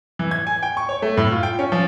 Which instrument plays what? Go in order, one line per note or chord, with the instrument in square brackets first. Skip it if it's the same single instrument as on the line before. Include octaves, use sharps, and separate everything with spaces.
[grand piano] E3
G#6
G#5
G5
C#6
C#5
A3
A2
F4
G5
C#4
F3